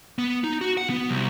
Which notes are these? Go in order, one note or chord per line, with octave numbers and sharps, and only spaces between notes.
B3
D#4
F#4
F#5
B3
C2